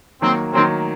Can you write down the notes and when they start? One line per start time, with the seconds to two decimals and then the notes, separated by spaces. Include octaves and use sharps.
0.21 D#3 F#3 A#3 C4
0.53 D#3 F#3 A#3 C4